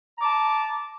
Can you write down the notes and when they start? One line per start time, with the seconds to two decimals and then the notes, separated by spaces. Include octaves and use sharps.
0.17 A#5
0.21 D6
0.25 A5